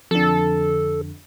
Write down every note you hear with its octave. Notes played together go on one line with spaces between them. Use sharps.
F2 D3 A4